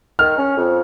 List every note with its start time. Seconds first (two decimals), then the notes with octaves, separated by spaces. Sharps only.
0.19 D#3 F6
0.38 C#4
0.57 F2